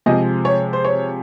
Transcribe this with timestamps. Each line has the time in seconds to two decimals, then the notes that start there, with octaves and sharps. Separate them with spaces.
0.06 C3 F3 G#3 D#5
0.45 C#5
0.73 C5
0.84 C#5